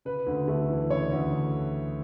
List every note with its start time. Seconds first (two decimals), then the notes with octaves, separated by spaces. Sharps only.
0.05 C#3 B4
0.26 D2
0.48 A3
0.70 E3
0.90 C#3 C#5
1.12 D2